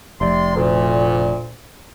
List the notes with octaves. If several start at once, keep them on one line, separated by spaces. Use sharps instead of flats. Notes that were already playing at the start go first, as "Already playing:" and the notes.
F1 C3 D5 C6
D2 A#2